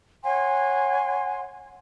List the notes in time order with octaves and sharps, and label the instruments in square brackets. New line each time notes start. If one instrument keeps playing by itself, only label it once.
[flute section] C#5 F#5 G#5 C6